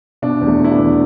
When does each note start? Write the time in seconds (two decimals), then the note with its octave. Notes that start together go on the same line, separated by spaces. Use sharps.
0.22 B2 D4
0.41 E2
0.47 A3
0.60 B2 E4
0.71 D4
0.78 E2